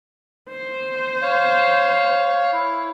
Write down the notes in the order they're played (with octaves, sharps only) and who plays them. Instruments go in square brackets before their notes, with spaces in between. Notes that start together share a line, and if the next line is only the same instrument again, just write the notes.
[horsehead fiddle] C5
[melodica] C#5 F5
E4